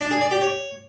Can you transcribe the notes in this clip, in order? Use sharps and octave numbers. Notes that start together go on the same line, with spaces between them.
D4
G#4
D5
G4
C#5